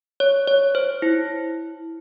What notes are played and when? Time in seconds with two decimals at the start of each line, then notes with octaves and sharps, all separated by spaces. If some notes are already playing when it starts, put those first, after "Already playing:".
0.20 C#5
0.48 C#5
0.75 C5
1.02 E4